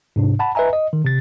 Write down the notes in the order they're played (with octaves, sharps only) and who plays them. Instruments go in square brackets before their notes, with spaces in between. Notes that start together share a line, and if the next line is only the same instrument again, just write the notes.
[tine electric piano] G#2 C3 D4
F#5 A5 B5
B4 D#5 E5 G#5 A#5
D#5
D#3
C3 A6